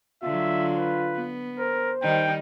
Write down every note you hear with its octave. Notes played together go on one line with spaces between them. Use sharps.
D3 F#3 F4 E5
B4
B3
A#4 C5
D#3 G3 D#4 G5